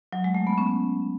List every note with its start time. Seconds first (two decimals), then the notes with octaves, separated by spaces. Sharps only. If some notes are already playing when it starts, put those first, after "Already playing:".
0.13 F#3
0.24 G#3
0.35 A3
0.47 B3
0.58 C#4